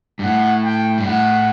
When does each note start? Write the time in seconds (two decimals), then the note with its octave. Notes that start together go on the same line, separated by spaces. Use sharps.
0.19 G2
0.23 A2 F#5
0.64 G5
0.98 G2
1.05 A2 F#5